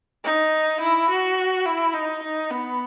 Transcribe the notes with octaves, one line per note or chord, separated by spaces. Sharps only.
D#4
E4
F#4
E4
D#4
D#4
B3